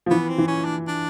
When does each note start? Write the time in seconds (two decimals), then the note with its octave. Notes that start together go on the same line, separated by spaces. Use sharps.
0.06 F3
0.11 E3 B3
0.29 C4
0.38 E3
0.48 C#4
0.65 D4
0.88 D4